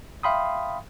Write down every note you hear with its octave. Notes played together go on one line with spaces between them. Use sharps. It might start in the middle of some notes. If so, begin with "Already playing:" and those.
E5 F5 G5 B5 C6 D#6